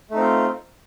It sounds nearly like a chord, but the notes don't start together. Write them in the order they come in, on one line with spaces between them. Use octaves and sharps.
A3 D#4 C4 F4